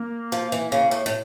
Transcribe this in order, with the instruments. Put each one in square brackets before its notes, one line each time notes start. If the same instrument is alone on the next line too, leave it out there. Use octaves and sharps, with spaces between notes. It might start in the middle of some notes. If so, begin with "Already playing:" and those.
Already playing: [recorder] A#3
[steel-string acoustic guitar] F3
E3
C#3
A2
A2